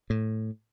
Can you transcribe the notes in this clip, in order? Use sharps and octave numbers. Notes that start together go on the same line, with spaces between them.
A2